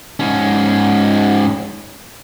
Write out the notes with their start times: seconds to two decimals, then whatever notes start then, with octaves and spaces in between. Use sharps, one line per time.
0.20 G#2 C#4